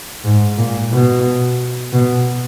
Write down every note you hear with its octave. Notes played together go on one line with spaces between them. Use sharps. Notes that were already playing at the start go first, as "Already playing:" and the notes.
G#2
A#2
B2
B2